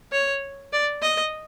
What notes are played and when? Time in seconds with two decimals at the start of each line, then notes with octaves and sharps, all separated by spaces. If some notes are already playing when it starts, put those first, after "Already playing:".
0.12 C#5
0.72 D5
1.02 D#5